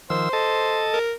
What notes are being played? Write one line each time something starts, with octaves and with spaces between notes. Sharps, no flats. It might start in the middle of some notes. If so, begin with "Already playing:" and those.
D#3 F3 C5 E6
A4 D#5 A5
A#4